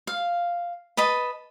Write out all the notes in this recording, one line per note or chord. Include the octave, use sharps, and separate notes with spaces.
F5
B4 D#5 A5 B5